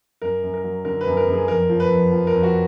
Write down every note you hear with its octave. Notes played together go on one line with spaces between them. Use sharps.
F#2 A#4
F#2
A#4
F#3
D3 A#4
B4
F#2
A#4
F#2
G#4
F2 A#4
F3
B4
F2
F3
A#4
F2
F#4